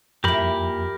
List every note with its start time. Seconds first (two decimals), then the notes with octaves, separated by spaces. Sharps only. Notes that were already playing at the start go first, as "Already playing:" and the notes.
0.24 F2 A#2 E4 G4 A#4 B5